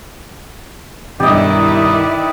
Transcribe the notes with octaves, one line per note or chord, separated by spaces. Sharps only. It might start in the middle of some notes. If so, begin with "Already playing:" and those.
B1 G2 D#3 E4 G4 B4 D5 D#5